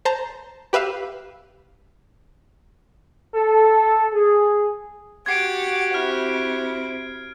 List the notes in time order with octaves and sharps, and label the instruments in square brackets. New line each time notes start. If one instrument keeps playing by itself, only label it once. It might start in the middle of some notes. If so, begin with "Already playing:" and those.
[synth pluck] C5 A5 A#5
G4 B4 E5 F5
[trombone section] A4
G#4
[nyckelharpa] F#4 G4 [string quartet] F#5 A6 [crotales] G#6 C7 D7
[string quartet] C4 E4 [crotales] F6